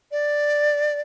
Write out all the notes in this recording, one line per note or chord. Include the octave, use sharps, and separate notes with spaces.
D5